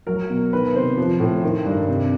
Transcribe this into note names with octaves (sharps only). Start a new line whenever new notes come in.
F#3 A#4
B2
D#3 B4
C3 C5
F3
A2
D#3
G2
C3